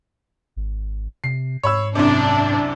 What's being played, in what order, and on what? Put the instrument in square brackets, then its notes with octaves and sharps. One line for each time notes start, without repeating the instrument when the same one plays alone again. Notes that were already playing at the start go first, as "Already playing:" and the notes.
[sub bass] G#1
[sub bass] C3 [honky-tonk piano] C7
[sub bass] G#2 [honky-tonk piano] C#5 B5 E6
[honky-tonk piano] C2 F#2 C3 [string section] D4